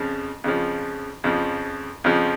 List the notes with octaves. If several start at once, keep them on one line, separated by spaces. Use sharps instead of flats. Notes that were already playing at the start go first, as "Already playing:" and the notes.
Already playing: F2 C#3 F3
F2 C#3 F3
F2 C#3 F3
F2 C#3 F3